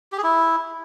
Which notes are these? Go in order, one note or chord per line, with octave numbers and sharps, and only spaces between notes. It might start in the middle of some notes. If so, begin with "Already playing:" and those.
G4
G#4
E4